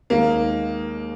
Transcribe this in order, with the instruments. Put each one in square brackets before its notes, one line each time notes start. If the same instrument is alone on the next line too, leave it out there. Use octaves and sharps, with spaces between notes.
[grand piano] D#2 D#3 G#3 D#4 [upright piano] A#3